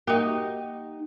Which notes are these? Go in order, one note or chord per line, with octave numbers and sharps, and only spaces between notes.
A#3 D#4 F#4 G4 A#4